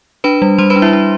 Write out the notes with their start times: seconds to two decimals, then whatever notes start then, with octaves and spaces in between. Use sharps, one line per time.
0.24 D4 B4 B5
0.42 G3
0.58 G3 C5 C6
0.70 B4 B5
0.76 D4
0.82 E4 E5
0.93 D4